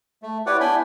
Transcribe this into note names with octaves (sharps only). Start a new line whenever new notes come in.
A3
E4 G4 B4 C#5 D5 F#5
B3 D4 E4 G5 G#5 B5